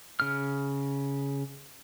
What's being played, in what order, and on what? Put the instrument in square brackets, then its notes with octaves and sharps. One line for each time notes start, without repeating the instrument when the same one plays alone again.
[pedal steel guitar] C#3 F6